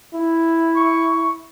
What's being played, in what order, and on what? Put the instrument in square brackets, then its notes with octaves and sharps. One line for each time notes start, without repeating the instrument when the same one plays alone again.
[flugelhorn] E4
[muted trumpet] C#6